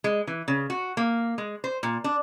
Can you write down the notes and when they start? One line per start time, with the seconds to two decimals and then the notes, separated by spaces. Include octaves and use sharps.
0.04 G#3
0.27 E3
0.48 C#3
0.70 F#4
0.97 A#3
1.38 G#3
1.64 C5
1.83 A#2
2.04 D4